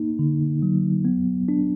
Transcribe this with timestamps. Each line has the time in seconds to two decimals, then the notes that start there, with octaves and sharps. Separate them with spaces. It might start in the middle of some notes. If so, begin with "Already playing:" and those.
Already playing: A#3 D#4
0.19 D3
0.62 F#3
1.05 B3
1.48 D4